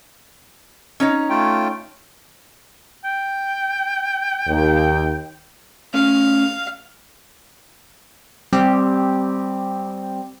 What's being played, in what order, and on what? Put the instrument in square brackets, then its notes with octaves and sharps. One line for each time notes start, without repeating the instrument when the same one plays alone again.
[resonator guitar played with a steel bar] C#4 D#4 C#5
[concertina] A3 F4 G5
[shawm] G5
[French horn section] D#2
[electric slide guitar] A3 C#4 [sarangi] F5
[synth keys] G3 C4 G4